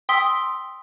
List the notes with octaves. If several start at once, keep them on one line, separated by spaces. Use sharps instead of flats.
G5 C6 D#6 E6 B6 G7